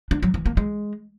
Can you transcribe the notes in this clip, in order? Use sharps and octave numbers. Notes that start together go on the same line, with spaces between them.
D4
F#3
E3
A#3
G#3